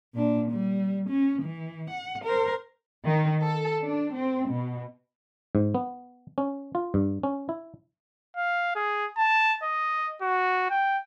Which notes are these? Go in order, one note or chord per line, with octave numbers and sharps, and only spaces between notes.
A#2 D4
G3
C#4
E3
F#5
A#4 C5
D#3
A4
D4
C4
B2
G#2
B3
C#4
F4
G2
C#4
E4
F5
G#4
A5
D#5
F#4
G5